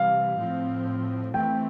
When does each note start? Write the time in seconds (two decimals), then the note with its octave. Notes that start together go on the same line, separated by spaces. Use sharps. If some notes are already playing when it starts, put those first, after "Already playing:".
Already playing: C3 E3 G3 F5
0.36 A2 F3 C4
1.33 E3 A3 C4 G5